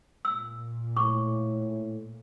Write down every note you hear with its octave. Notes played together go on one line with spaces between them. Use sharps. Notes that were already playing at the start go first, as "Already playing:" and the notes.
A#2 E6
A2 C#6 D6